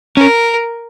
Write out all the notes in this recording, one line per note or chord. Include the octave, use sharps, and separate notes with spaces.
C#4 A#4